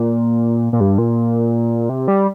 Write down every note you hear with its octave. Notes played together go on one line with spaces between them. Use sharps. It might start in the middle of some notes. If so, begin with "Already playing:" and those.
Already playing: A#2
A#2
G2
A#2
C3
G3